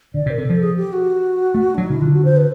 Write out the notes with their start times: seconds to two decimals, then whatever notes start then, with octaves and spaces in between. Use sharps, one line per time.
0.14 D3 D5
0.26 C3
0.30 A#4
0.38 C3 A4
0.50 F3
0.61 G#4
0.76 G4
0.93 F#4
1.54 A3
1.75 F#3 D4
1.83 D#4
1.90 C#3 E4
2.01 D3 F4
2.13 F#4
2.25 C5
2.37 B4